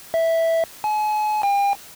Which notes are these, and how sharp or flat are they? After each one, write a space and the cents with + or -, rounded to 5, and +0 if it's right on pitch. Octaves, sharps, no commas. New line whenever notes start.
E5 -5
G#5 +40
G5 +40